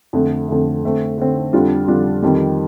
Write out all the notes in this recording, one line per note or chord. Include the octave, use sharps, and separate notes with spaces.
F2 D3 A3
F2 D3 A3
D3 A3 C4
D3 A3 C4
F2 D3 G3 D4 F4
F2 D3 G3 D4 F4
F2 D#3 G3